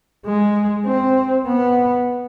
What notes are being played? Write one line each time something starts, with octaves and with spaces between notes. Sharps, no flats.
G#3
C4
B3